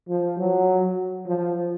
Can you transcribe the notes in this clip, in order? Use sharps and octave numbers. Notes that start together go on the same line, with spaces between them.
F3
F#3
F3